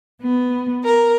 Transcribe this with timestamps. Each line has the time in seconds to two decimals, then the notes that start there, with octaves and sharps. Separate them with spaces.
0.22 B3
0.84 A#4